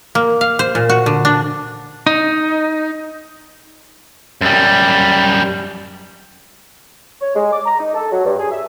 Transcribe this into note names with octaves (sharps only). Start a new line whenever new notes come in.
A#3
F5
C5
A#2
F#4
D3
D4
D#4
F#2 G3
C#5
G#3
D6
A#5
D#4
A4
F#3
G2
G#4
E5